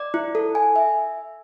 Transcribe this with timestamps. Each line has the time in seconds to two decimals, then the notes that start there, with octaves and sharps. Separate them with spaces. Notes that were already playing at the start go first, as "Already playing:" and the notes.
Already playing: D5
0.14 E4
0.35 A4
0.55 G#5
0.76 E5